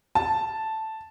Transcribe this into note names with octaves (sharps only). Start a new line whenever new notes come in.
A5